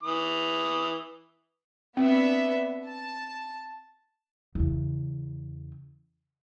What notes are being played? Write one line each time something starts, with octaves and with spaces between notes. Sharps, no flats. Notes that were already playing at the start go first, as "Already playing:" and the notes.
E3 D#6
B3 C4 D4 E5
A5
E2 C#3